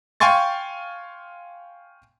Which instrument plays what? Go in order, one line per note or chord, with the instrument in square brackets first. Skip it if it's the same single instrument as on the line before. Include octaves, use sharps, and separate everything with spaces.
[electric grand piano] F5 G5 G#5 C6 C#6 A6